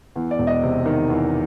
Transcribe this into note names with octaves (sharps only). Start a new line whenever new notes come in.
E2
D5
E1
D#5
C3
D#3
E2